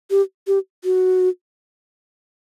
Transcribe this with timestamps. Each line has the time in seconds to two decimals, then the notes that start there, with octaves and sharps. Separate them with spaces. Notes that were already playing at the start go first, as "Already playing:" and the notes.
0.11 G4
0.47 G4
0.84 F#4